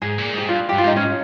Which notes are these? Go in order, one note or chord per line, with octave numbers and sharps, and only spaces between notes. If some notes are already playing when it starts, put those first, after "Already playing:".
G#2 G#4
A#2
G#2 G4
G2 F4
G2 G4
F4
G#2 D#4
G#2 C#4